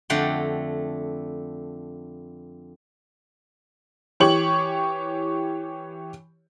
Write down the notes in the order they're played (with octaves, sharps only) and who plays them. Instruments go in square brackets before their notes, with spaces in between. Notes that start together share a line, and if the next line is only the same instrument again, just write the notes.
[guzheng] F2 D3 A3 F#5 G5 C6
[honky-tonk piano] E3 G4 C#5 C#6 F#7